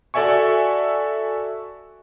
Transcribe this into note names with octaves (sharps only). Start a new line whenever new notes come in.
F#4 A4 D5 E5 G#5 C#6